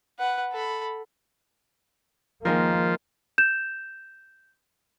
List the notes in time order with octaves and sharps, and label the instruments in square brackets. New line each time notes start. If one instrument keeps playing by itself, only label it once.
[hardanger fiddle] B4 F#5
A4 B5
[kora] D#3 G#3 A#4 [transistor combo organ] F3 [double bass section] A#3
[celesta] G6 E7